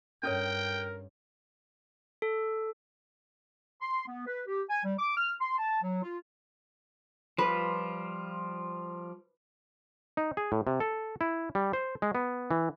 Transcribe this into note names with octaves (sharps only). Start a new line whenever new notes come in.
G2 C#4 A4 A#4 C#5 G5
A4
C6
B3
B4
G4
G#5
G3
D6
F6
C6
A5
F#3
F4
F3 G3 F4 B4
D#4
G#4
A2
C3
A4
E4
G3
C5
G#3
B3
E3